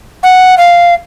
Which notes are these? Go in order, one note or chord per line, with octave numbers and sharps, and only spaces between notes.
F#5
F5